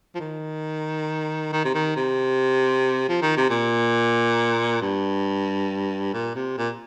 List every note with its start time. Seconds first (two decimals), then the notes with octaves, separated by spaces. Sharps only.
0.15 F3
0.20 D#3
1.53 D#3
1.65 C3
1.75 D#3
1.96 C3
3.09 F3
3.22 D#3
3.37 C3
3.50 A#2
4.81 G2
6.14 A#2
6.36 C3
6.58 A#2